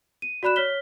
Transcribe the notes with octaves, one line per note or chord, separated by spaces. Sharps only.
D#7
F#4 D5 B5 F#6 E7
C#5 F6 B6 G7